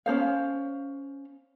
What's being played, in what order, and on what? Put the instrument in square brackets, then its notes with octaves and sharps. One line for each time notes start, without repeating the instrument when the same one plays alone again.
[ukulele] C#4 D4 C5 F5